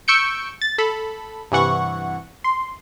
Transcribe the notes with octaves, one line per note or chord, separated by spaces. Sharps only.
C#6 E6 G6 C#7 D7
A6
A4 B5
G2 C3 E3 F#5 C#6
C6